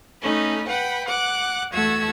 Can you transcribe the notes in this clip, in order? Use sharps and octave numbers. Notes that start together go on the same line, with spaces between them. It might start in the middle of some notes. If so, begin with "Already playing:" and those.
A3 C#4 D#4 B5
B4 F#5 G5 B5
F#5 D6 F#6
E2 A3 F#4 F#5 E6 G#6